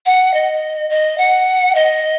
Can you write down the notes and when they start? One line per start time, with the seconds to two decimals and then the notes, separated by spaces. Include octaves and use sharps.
0.06 F#5
0.34 D#5
0.90 D#5
1.18 F#5
1.75 D#5